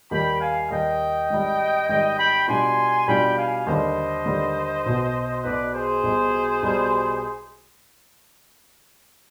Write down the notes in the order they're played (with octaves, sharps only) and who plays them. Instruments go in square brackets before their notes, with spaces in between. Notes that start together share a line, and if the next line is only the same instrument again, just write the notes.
[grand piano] D#2 D#3 G3 [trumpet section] G5 B5
[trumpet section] F5 G#5
[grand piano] D#2 D#3 G3 [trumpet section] D#5 G5
[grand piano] G#1 G#2 G3
[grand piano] G#1 G#2 G3 [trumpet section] D#5 G5
[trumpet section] G5 B5
[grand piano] B2 G3 D4 F4 [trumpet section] G#5 C6
[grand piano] B2 G3 D4 F4 [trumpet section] G5 B5
[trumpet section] F5 G#5
[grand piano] D#2 D3 G3 [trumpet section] C5 D#5
[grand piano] D#2 D3 G3
B1 B2 B3
[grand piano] B1 B2 B3 [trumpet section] B4 D5
[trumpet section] G#4 C5
[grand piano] B1 B2 G3
B1 B2 G3